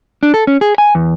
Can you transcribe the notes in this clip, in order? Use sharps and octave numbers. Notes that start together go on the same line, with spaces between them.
D4
A4
C#4
G#4
G#5
E2